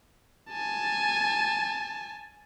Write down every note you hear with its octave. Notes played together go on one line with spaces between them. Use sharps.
G#5 A5